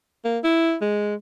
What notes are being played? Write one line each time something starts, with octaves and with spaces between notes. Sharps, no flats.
A#3
E4
G#3